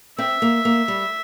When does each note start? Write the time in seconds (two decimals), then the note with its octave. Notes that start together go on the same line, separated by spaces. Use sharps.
0.18 C4 E5
0.42 A#3
0.65 A#3
0.88 G3